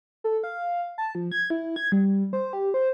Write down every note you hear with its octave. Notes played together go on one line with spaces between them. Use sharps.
A4
F5
A5
F3
G#6
E4
G#6
G3
C5
G4
C5